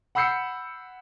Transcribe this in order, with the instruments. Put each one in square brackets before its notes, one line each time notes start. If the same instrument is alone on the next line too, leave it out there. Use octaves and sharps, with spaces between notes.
[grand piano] F#5 B5 E6 G6 C7 C#7